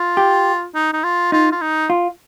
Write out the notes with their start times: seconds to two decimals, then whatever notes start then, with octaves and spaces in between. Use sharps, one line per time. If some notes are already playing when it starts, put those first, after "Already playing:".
Already playing: F4
0.17 G4
0.75 D#4
0.93 D#4
1.04 F4
1.32 D#4 F4
1.52 F4
1.61 D#4
1.90 F4